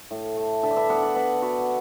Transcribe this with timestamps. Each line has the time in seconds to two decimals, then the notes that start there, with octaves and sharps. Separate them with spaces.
0.11 A2
0.37 A3
0.63 D3 E5 A5
0.71 D5
0.77 B4 E5
0.89 B3 D5 F#5
1.03 D5 F#5
1.16 B3 B4 E5
1.42 B3 F#4 B4